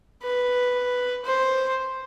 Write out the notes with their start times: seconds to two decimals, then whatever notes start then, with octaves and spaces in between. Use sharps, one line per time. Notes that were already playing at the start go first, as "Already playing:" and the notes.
0.23 B4
1.25 C5